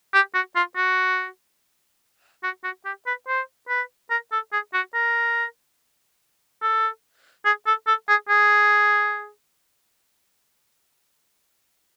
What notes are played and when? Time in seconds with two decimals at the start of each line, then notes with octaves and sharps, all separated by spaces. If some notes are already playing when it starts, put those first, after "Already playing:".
0.14 G4
0.34 F#4
0.56 F4
0.77 F#4
2.44 F#4
2.64 F#4
2.85 G4
3.07 B4
3.28 C5
3.69 B4
4.10 A#4
4.32 A4
4.53 G#4
4.74 F#4
4.94 A#4
6.62 A4
7.45 G#4
7.67 A4
7.87 A4
8.09 G#4
8.29 G#4